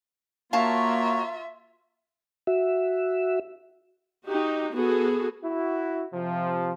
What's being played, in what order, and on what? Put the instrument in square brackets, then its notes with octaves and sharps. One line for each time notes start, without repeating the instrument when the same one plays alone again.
[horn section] A#3 [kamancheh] F4 E5 [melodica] F#4 C#5 A#5 [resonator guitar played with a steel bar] F5 A5
[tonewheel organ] F#4 E5
[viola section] D#4 F#4 G4
B3 F#4 G#4 A4
[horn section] E4 F#4
C3 F3